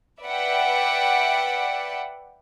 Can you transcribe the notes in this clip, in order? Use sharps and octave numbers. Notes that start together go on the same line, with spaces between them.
B4 D5 E5 F#5 G5